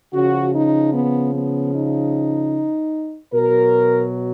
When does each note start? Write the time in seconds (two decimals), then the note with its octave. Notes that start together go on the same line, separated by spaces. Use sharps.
0.13 C#3 F3 F#4
0.53 D#4
0.93 B3
1.33 B3
1.73 D#4
3.32 B2 F#3 A#4